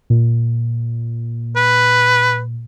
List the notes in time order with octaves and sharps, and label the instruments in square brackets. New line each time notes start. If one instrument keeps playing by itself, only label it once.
[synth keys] A#2
[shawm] B4